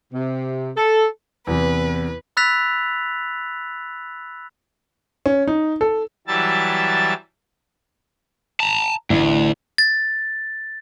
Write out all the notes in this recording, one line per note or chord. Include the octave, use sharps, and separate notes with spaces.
C3
A4
E2 C3 E3 B4
B5 E6 F#6 A6 B6 F7
C#4
D#4
A4
E3 F#3 G3 E5 A5 A6
A5 A#5
A1 D2
A6